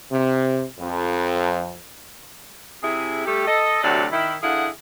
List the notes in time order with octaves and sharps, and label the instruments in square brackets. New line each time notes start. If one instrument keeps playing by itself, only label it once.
[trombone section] C3
F2
[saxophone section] C3 E4 G#4
G3 A3 G4
A4 D#5
D2 C3 F#3 F#4 D5
D#3 E4
D3 E4 G#4 F5 F#5